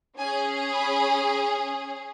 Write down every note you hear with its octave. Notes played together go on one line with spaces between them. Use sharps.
C#4 G#4 G#5
B5